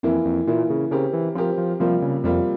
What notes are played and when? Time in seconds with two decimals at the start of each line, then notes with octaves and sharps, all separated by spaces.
0.03 F2 E3 A#3 E4
0.25 F2
0.47 A#2 E3 A#3 E4
0.70 C#3
0.91 C#3 C4 G4 A#4
1.13 E3
1.35 F3 C4 G4 A#4
1.58 F3
1.80 C3 F3 G3 A#3 F4
2.02 C#3
2.24 F2 C3 G3 A#3 F4